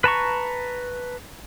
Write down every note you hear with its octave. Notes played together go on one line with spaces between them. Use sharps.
B4 A5 A#5 C#6